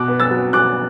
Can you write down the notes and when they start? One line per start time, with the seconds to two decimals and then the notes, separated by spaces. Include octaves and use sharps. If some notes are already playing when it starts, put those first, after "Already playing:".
Already playing: B2 D6 F#6
0.08 B3
0.20 E6 A6
0.31 F#3
0.53 B2 D6 F#6